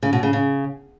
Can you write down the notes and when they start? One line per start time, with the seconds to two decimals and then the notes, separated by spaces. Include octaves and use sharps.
0.03 C#3
0.13 B2
0.23 C#3
0.33 C#3